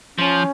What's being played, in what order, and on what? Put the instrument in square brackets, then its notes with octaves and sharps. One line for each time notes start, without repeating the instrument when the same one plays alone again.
[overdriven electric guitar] F3 [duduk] C#4